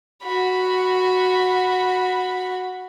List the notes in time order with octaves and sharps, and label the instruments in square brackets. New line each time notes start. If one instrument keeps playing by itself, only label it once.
[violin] F#4 B5